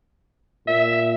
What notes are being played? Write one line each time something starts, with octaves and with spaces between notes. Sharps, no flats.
A#2 E5